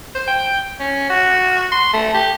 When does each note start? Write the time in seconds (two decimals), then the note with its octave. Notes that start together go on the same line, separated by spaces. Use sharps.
0.15 C5
0.27 G5
0.80 C#4
1.10 F#4
1.72 C6
1.93 A3
2.15 G4